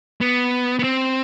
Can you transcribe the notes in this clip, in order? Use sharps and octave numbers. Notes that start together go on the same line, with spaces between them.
B3
B3
C4